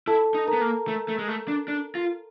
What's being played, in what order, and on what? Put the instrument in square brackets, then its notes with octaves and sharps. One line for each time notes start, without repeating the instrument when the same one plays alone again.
[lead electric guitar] E4 [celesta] A4 A5
[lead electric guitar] D#4
[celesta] A#4 A#5
[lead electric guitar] B3
A#3
A3
A3
G#3
A3
D4
D4
F4